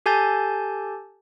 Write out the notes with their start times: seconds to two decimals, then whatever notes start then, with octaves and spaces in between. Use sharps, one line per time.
0.06 G4 A4 G#5 A5 G6 A6